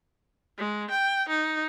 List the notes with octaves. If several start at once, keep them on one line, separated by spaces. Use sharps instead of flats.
G#3
G5
D#4